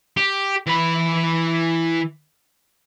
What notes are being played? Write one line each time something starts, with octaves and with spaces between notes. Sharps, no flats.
G4
E3 B5